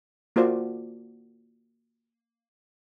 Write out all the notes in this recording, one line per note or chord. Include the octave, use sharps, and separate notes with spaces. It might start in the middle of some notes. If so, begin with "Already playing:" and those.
A#3 F4 F#4 C5 D5